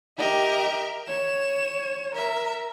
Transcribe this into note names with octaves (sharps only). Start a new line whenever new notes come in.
G4 A#4 D#5 E5
C#5 E7
A#4 E5